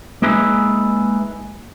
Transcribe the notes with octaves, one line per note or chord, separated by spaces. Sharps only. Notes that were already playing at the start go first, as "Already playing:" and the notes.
G#3 A#3 D#4 G#4 B4 E5